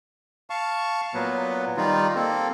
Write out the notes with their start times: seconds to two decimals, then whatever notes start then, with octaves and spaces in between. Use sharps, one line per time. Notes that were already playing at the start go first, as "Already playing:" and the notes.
0.50 F5 A5 C#6
1.14 A#2 F#3 B3
1.77 D#3 G3 D#4 F4
2.15 A#3 C4 A4